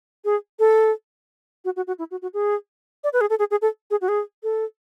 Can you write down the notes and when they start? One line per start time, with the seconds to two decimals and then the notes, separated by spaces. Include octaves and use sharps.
0.25 G#4
0.59 A4
1.65 F#4
1.76 F#4
1.87 F#4
1.99 E4
2.11 F#4
2.22 F#4
2.34 G#4
3.04 D5
3.13 B4
3.21 G#4
3.30 A4
3.39 G#4
3.51 G#4
3.62 A4
3.91 G#4
4.01 F#4
4.08 G#4
4.43 A4